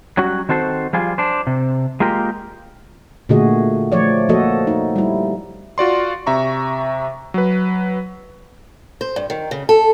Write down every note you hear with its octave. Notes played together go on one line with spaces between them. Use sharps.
F#3 G3 C#4 F#4
D#3 C4 F#4 A4 C5
F3 G3 F4 G#4
D4 C5
C3
G#3 A#3 F4 G4 A#4
A#2 D3 A3 F#4 G#4 D#5
F3 A3 C#5 D5
F3 A#3 F#4 A4 D#5
D#4
G3 E4
F4 F#4 D5 C6
C3 E5 A#5 C#6
F#3 B4
C5
G2
D#3
C#3
A4